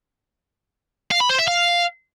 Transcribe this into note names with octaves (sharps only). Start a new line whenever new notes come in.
F5
B5
C5
E5
F5